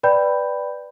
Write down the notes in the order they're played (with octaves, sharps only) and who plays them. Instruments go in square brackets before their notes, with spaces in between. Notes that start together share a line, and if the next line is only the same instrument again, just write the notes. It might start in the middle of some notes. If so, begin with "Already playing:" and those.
[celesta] B4 D5 G5 B5 G6